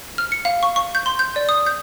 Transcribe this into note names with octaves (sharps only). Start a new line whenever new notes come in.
F6
C#7
F5
C#6
C#6
G6
C6
G6
D5
D#6
G6